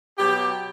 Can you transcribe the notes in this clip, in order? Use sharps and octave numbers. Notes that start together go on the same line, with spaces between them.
B2 F#3 G4